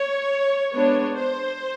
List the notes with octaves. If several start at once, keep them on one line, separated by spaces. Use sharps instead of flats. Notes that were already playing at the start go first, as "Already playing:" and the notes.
Already playing: C#5
G#3 B3 D4 C#5
C5